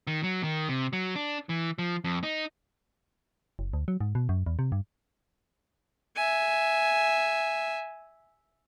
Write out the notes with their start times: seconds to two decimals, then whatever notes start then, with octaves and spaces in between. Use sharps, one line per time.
0.07 D#3
0.23 F#3
0.43 D#3
0.69 C3
0.93 F#3
1.16 D4
1.49 E3
1.78 F3
2.04 F2
2.23 D#4
3.59 F#1
3.73 D2
3.88 F#3
4.01 G#2
4.15 B2
4.29 F#2
4.46 E2
4.59 C3
4.72 G2
6.16 E5 G#5